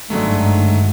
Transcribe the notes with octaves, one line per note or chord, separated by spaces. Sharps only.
G1 G#2 D#3 F#3 G#3 A3 D4